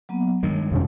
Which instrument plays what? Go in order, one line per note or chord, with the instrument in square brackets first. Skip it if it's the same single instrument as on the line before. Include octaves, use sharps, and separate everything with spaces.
[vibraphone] F#3 A#3 B3
[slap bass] G2 D#3 G#3 [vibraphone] C#5
[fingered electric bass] F2 B2 C#4